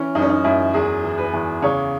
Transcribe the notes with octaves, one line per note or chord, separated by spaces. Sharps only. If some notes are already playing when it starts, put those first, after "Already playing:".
Already playing: E3 C#4
F#2 D#4
C#4
D#4
F#2 E4
E2 G#4
E3
B4
E2
C#3 C#5